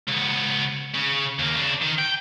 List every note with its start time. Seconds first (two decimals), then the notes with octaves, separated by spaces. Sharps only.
0.08 C#2 B3
0.94 C#3
1.39 D#2 A#3
1.55 C#3 D4
1.82 D#3
1.99 G5